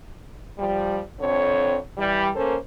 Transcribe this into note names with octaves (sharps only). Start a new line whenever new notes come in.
F3 G3
F2 D3 C4 C#5
E3 G3
A#3 C#4 A4 A#4 C5